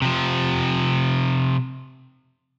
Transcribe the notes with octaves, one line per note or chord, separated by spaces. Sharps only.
C3 F3